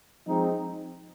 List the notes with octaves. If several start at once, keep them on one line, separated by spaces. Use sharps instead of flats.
F3 G#3 C4 D#4